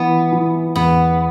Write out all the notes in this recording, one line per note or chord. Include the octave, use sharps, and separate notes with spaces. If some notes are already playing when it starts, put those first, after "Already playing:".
Already playing: E3 B3
E3
E2 B3